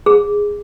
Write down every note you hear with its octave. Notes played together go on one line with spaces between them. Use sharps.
G#4